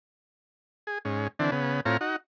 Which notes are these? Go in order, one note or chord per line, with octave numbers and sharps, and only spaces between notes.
G#4
G#2 C#4
D3 E3 C4 D4
C#3 B3
A2 C4 F4 C#5 A#5
D#4 F#4